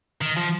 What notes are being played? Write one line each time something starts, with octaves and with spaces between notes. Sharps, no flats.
D#3
F3